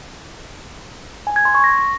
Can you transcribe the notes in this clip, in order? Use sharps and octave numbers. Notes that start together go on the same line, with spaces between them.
G#5
G#6
C6
C#6
A#6